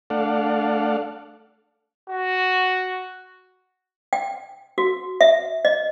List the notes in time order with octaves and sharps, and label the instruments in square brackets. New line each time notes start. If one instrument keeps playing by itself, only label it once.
[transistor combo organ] A3 D4 A4 D5 F5 F#5
[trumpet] F#4
[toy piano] G5
F#4
E5
D#5